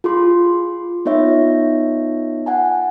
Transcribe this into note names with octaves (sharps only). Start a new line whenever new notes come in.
F4 G#4 C6
B3 D#4 F4 C#5 E5
F#5 G#5 A5